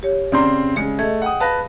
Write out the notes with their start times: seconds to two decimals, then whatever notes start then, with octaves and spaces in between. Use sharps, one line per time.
0.03 G4 C#5
0.32 C#3 C4 D5 A#5 C6
0.76 C#3 G#3 G#4 C#7
0.99 A3 D#5 G#6
1.22 F#5 G5 D#6
1.41 B4 F5 A5 A#6